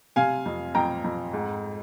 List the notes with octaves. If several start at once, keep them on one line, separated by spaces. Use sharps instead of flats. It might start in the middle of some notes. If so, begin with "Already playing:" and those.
C3 F5 G#5
F2
F2 G5 A#5
F2
G#2